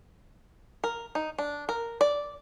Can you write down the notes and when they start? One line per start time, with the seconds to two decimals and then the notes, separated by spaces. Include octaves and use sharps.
0.84 A#4
1.15 D#4
1.38 D4
1.69 A#4
2.01 D5